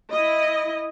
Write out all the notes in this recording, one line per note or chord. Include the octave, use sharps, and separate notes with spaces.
E4 D#5